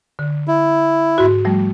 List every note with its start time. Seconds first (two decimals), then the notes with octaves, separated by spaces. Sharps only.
0.19 D3
0.48 E4
1.18 G#2 F#4
1.45 F3 G3 A3